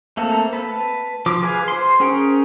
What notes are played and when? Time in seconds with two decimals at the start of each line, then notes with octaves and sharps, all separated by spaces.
0.17 A3 A#3 C4 A4
0.53 B4 A5
1.26 F3 D6
1.43 G#4 B4 F5 G#5
1.68 C5 C6
2.00 C#4 G#4 A#4 G5 C#6